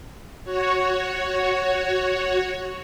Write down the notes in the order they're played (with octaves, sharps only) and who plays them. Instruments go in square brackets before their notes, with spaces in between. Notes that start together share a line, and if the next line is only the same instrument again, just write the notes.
[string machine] F#4 C#5